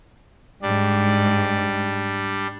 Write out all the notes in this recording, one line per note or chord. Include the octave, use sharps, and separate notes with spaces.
G#2 G3 D4